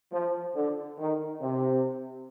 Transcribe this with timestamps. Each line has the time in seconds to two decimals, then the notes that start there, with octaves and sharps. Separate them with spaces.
0.12 F3
0.56 D3
0.99 D#3
1.42 C3